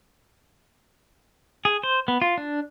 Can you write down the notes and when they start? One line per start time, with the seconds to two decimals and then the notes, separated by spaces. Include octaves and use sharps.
1.65 G#4
1.83 C5
2.08 B3
2.22 F4
2.38 D4